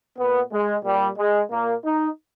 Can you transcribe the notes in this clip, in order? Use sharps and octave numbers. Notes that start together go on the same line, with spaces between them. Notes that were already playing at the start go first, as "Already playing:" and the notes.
A#2 B3
G#3
A#2 G3
G#3
A#2 A#3
D#4